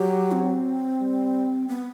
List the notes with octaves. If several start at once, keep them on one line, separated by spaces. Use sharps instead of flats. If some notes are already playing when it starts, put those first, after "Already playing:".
Already playing: F#3 G4
C4
G3
B3